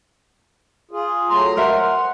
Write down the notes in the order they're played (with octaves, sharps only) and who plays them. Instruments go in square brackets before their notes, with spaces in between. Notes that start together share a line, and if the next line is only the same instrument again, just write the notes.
[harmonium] F4 G#4
[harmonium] F#3 A3 A#5 [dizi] C6
[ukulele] A#4 C5 E5 [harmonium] F#5